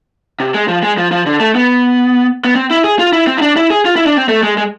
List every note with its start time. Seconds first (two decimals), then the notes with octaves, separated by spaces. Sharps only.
0.40 C3
0.54 G#3
0.68 F3
0.83 G#3
0.98 F3
1.11 F3
1.26 D3
1.40 A3
1.55 B3
2.45 B3
2.56 C4
2.70 E4
2.84 G#4
2.99 F4
3.13 E4
3.27 C4
3.37 E4
3.42 D4
3.56 E4
3.70 G#4
3.85 F4
3.96 E4
4.06 D4
4.17 C4
4.29 A3
4.43 G#3
4.58 G#3